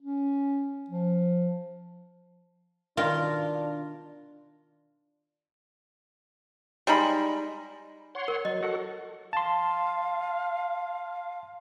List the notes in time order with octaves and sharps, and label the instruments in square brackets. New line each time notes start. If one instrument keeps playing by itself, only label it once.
[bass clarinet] C#4
F3
[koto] B2 D#3 A#4 [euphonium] D4 [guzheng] F4
[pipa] G3 G#3 D#4 B5
[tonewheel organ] C#5 F#5 C6
[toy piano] A#4
[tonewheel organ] F#3 [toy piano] D#5
[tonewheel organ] F#4 A4 F#5
[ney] F5 [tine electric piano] A5 C6